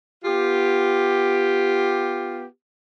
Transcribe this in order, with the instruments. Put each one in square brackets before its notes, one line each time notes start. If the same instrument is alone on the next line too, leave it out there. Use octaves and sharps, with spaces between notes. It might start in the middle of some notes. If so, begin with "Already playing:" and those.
[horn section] B3 F4 G4